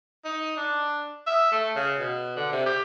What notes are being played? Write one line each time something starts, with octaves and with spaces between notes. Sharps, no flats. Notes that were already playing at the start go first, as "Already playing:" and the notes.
D#4
D4
E5
A3
C#3
B2
D3
C3
G4